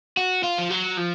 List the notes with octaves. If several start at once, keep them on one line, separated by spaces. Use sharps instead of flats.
F#4
F4
F3
F#3
F3